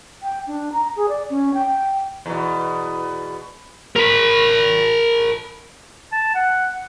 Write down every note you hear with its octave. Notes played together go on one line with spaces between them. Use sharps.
G5
D4
A#5
G#4
D5
C#4
G5
E2 B2
A#4 B5
A5
F#5